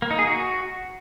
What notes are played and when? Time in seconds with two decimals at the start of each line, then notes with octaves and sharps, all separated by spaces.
0.02 A#3
0.11 D#4
0.19 G#4
0.27 F#4